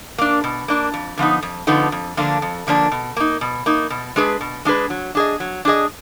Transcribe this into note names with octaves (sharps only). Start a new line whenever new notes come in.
A#3 D4
B2
A#3 D4
F2
D3 F3 B3 D#4
F2
D3 F3 B3 D#4
F2
D3 F3 A#3 D4
F2
D3 F3 A#3 D4
B2
A#3 D#4
B2
A#3 D#4
B2
G#3 D4 G#4 B4
B2
G#3 D4 G#4 B4
F#3
D4 G#4 D#5
F#3
D4 G#4 D#5